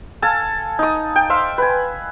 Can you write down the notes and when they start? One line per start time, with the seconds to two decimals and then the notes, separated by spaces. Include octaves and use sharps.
0.22 A4 F5 G#5 A5
0.79 D#4 D#6
1.16 G5
1.30 C5 E5 F5
1.58 B4 G#5